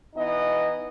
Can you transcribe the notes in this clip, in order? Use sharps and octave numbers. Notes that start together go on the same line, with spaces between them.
E3 B3 D#4 D#5